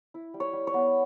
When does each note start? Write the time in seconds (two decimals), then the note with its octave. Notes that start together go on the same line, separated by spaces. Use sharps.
0.14 E4
0.34 G3
0.40 C#5
0.53 G3
0.67 C#5
0.74 B3